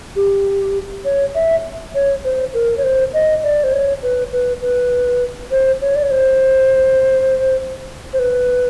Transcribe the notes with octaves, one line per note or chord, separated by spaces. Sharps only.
G4
C#5
E5
C#5
C5
A#4
C#5
C5
D#5
D5
C5
C#5
B4
B4
B4
C5
C#5
D5
C#5
C5
C5
B4